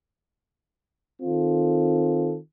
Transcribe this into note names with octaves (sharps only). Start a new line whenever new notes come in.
D#3 C4 F4 A4